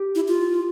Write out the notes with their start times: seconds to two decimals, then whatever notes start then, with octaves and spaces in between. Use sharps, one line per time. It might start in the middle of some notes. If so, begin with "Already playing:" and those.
Already playing: G4
0.15 E4
0.28 F4